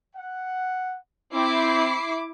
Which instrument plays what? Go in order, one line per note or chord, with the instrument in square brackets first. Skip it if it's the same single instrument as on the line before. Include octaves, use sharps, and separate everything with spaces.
[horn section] F#5
[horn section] C4 [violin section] E4 D6 C7